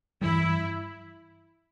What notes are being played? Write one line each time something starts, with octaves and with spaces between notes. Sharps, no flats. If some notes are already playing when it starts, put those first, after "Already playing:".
G2 E3 G3 E4